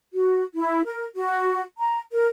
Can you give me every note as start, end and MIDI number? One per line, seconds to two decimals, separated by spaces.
0.14 0.42 66
0.55 0.81 64
0.86 1.05 70
1.16 1.61 66
1.78 1.99 82
2.12 2.26 70